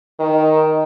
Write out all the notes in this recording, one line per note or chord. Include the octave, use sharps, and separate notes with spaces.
D#3